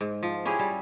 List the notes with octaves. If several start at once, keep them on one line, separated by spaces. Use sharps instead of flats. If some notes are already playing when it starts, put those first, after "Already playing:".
G#2
F3
C#4 E4 G4 G#4
G3